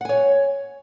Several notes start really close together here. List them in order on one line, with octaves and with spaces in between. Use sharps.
F#5 G#5 C#5